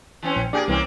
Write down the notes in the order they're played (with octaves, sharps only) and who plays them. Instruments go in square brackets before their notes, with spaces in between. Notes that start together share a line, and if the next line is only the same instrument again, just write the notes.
[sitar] E3 C4 C#4
[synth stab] A#1
[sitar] A#3 G#4 [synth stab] D4 G4 D5
[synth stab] C2 E3 [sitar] A#3 C4 C#4